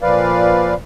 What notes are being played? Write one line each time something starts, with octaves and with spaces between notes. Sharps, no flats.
A#2 F3 B4 D5 F5